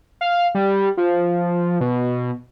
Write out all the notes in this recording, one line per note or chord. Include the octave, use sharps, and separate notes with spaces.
F5
G3
F3
B2